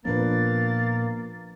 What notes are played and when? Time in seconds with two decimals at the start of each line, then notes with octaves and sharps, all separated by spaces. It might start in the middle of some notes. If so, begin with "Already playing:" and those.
0.05 A#2 F3 A#3 B3 D4 B4 A6